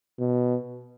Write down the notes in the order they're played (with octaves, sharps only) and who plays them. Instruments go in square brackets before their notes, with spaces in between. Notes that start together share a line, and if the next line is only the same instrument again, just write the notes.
[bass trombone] B2